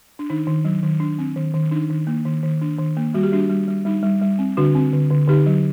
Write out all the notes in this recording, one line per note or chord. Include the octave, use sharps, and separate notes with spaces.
D4
D#3 D#4
D#3
F#3
D#3
D#3 D4
C4
D#3
D#3
D4 D#4
D#3
A#3
D#3
D#3
D4
D#3
A#3
G3 F#4
G4
G3 D4 F#4
G3
G3
G3 D#4
G3
G3
C4
D3 D4 F#4
C4
D3
D3
D3 D#4 G4
F#3